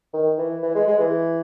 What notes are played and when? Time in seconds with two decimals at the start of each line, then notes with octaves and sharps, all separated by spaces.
0.13 D#3
0.38 E3
0.63 E3
0.75 G#3
0.87 G#3
0.99 E3